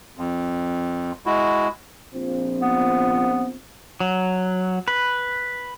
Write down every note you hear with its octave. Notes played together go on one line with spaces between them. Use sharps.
F2
G#3 E4 F#4
A#1 F3 C4
B3
F#3
B4